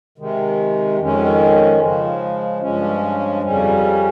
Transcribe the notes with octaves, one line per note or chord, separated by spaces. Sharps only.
C3 D#3 G#3
F2 D#3 G#3 C#4
C#3 F3 G#3
G2 F3 G#3 C#4
F2 C#3 G3 C#4